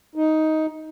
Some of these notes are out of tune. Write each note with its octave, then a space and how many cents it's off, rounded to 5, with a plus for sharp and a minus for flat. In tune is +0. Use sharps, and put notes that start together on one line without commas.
D#4 +10